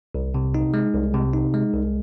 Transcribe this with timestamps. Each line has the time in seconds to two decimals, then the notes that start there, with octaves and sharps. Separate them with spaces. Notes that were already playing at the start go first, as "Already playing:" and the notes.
0.15 C2
0.34 C3
0.54 D#4
0.74 G#3
0.94 C2
1.14 C3
1.34 D#4
1.54 G#3
1.73 C2